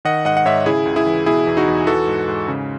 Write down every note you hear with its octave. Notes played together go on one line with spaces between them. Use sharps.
D#3 D#5 F#5
G#2 D#5 F#5
F#5
G#2 C#5 E5
C#3 E4 G#4
C#2
E4 G#4
E3
B2 E4 G#4
E2
D#4 F#4
E2
E3 F#4 A4
G#2
G#2
C#3